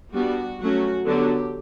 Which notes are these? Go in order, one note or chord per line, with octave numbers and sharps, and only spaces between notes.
G3 B3 D4 F#4
F#3 A3 C#4 F#4
D3 F#3 B3 D4 G4